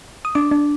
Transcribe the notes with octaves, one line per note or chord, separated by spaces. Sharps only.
D#6
D4 D6
D4